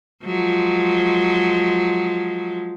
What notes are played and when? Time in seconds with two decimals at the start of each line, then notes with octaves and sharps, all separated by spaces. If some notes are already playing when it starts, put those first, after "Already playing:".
0.25 F3 F#3 G#3